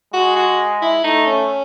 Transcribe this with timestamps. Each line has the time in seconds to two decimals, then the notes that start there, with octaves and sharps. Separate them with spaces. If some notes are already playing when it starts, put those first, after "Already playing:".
0.14 G#3 F#4
0.36 F#4
0.82 E4
1.04 A3 D#4
1.27 C#4